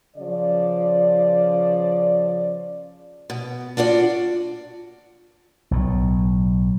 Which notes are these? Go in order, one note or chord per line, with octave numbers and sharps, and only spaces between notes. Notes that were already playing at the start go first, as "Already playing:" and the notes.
C#3 F3 D5
B2
D4 F4 F#4 D5
B1 A2